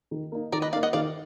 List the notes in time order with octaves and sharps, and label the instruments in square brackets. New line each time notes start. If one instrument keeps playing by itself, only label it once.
[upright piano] D#3
A#3 D#4
[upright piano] D#3 [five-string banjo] A#4 D5
[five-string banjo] B4 D#5
[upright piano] D#4 [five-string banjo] D5 F5
[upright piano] A#3
[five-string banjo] D#5 F#5
[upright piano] D#3 [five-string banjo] D5 F5